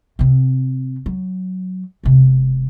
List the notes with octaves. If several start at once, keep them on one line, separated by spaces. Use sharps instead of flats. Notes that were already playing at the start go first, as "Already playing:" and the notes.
C3 C4
F#3
E1 C3